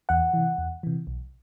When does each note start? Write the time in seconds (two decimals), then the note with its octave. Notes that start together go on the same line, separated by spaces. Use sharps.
0.09 E2 F#5
0.34 C3 E3
0.58 E2
0.83 C3 E3
1.07 B1